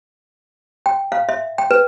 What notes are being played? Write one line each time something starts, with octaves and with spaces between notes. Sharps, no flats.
G5
F5
E5
G5
B4